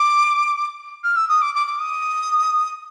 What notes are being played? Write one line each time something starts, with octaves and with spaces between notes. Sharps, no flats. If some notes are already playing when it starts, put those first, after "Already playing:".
Already playing: D6
F6
E6
D#6
D6
D6
D6
D#6